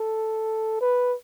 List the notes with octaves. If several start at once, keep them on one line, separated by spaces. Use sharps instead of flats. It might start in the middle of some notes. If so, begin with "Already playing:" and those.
Already playing: A4
B4